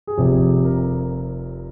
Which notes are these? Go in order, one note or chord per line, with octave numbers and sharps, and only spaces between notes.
G#4
F1 F2 C3 G4
A#4